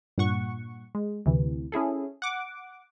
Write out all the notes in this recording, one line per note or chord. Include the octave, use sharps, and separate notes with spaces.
G2 A#2 F#5 C#6
G#3
D2 C3 E3
C#4 E4 G#4 A4
F#5 D6